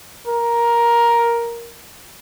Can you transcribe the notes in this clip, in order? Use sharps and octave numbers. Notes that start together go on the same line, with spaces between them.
A#4